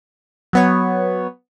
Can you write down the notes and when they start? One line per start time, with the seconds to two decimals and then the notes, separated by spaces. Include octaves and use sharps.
0.53 F#3 B3 C#5